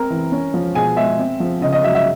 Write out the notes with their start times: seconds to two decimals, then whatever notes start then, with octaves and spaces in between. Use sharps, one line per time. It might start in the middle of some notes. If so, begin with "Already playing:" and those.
Already playing: C4 A#4 A#5
0.10 E3
0.32 C#4
0.54 F3
0.75 B2 G#4 G#5
0.97 G#3 E5
1.19 C4
1.40 F3
1.62 C#3 D#5
1.73 D#5
1.84 F#3 E5
1.95 E5